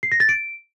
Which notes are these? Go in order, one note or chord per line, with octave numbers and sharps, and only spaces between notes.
C7
A#6
A6
D7